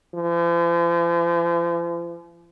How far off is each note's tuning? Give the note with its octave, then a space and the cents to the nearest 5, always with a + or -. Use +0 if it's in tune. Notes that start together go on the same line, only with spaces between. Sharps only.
F3 -45